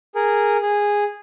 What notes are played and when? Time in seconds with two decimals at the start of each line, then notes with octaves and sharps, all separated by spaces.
0.15 G#4 A#4
0.62 G#4